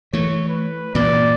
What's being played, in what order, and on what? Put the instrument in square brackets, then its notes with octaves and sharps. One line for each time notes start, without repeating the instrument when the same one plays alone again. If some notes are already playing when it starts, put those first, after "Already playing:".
[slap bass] E3 A3 [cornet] C#5
[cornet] B4
[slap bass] G2 A#2 E3 [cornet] D5